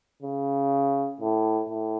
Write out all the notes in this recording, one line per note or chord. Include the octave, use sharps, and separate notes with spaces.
C#3
A2
A2